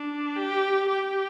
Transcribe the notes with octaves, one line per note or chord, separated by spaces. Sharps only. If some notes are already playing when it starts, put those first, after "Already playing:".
Already playing: D4
G4
G4